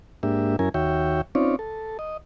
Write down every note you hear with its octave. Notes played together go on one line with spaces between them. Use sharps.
G#2 A#3 D4 G4 E5
F#2 C#4 E4 A#4 G#5
D#2 F#4 C#5 E5 G5
C4 C#4 D#4 F4 C#5 D5
A4
D#5